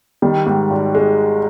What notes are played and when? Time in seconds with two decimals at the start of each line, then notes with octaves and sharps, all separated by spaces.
0.22 D#3 G3
0.46 G#2
0.70 G#1
0.95 G#3